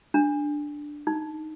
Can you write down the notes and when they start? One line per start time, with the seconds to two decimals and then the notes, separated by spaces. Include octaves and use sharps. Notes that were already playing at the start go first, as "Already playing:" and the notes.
0.14 D4
1.07 D#4